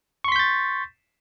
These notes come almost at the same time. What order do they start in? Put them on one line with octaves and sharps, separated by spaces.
C#6 C6 B6 G6 A6